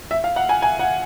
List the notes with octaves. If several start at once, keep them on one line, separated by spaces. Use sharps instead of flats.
E5
F5
F#5
G#5
G#5
F#5